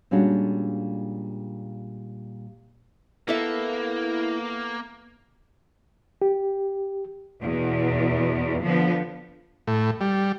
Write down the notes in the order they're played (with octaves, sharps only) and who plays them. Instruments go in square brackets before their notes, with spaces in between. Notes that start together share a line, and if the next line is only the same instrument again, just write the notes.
[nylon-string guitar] A#2 G3 G#3 C#4 D4 F#4
[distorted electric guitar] A#3 [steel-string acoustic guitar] B3 A4 E5 [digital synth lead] E4
[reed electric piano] G4
[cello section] E2 B2
D3 F3 B3
[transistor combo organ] A2
G3